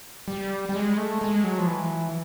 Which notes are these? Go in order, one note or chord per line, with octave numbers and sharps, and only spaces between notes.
G3
G3
G#3
A3
G#3
F#3
F3
E3